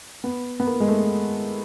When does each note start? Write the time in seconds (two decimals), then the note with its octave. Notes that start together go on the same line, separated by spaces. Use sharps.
0.24 B3
0.60 B3
0.67 A#3
0.80 G#3
0.88 A3